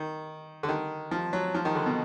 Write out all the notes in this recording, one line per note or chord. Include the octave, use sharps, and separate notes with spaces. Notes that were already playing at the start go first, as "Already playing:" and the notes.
Already playing: D#3
D3
D#3
F3
F#3
F3
D#3
D3
B2